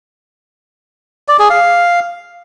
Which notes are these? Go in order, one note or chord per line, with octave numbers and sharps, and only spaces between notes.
D5
G#4
F5